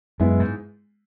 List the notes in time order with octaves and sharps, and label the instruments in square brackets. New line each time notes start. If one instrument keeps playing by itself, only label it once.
[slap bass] F#2 [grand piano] G#3 B3 E4
[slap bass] G#2